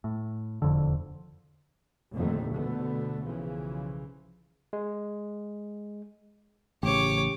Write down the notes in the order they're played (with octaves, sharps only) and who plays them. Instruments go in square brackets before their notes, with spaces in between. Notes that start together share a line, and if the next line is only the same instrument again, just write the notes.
[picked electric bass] A2
E1 F2 D3
[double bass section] F1 A#1 F2 D3 D#3 A3
D2 B2 D3 A3 B3
B1 C#3 E3 F3
[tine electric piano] G#3
[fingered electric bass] A1 C#3 [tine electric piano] G4 [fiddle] C#5 D6